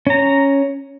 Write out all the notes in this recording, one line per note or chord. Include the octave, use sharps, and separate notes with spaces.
C#4 A#5